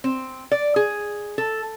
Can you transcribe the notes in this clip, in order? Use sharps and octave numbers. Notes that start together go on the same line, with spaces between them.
C4
D5
G#4
A4